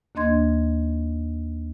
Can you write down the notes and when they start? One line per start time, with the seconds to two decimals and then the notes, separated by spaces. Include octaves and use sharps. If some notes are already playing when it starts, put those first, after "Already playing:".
0.15 D#2 A#3 D4 D#5 C6 G#6